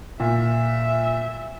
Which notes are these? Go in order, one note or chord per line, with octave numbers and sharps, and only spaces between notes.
A#2 E5